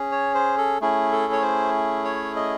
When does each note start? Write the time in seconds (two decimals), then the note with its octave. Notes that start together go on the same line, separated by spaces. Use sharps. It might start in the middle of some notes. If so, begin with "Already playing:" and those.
Already playing: C#4 G#4
0.12 C#5
0.35 C5
0.58 A4
0.81 A3 C#4 E4 G#4
1.12 A4
1.33 C#5
1.42 C5
2.05 C#5
2.36 D#5